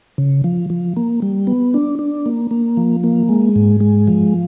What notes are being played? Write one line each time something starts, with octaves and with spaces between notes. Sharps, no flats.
C#3
F3
F3
A#3
G3
B3
D4
D4
A#3
A#3
F3
A#3
G#3
G#2
G#3
F3